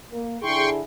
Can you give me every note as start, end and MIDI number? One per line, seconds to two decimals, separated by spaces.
0.12 0.36 58
0.42 0.79 50
0.42 0.79 64
0.42 0.79 68
0.42 0.69 79
0.42 0.69 84
0.42 0.69 85